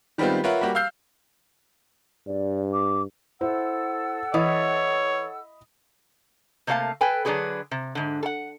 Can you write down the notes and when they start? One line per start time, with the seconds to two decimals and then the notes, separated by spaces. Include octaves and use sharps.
0.18 D#3 G3 G#3 B3 C4 F4
0.44 F4 A#4 B4 C#5 E5 F#5
0.61 G3 A#3 F#4 G4
0.75 F5 E6 F6 G6 C7
2.27 G2 D5
2.73 D6
3.41 E4 A4 C5 F#5 E6
4.34 E3 C#5 D#5 B5 D#6
6.67 C3 A3 A#3 C#5 F5 A5
7.01 A4 B4 G5 G#5
7.25 D3 F#3 D4 F#4 G#4 B4
7.71 C3
7.95 G#2 D3
8.23 A4 F#5